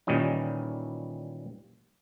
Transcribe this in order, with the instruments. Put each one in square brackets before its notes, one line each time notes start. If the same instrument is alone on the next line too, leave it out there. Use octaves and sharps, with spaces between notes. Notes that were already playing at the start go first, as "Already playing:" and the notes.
[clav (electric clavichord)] A#2 D#3 E3 G3 C#4 D#4